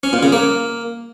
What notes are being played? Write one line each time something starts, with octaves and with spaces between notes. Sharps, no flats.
C#4
A#2
C#3
A#3